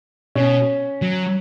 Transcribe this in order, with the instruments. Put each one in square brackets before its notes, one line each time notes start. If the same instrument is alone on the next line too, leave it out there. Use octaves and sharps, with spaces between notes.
[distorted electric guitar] B2 [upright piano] C#4
[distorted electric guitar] F#3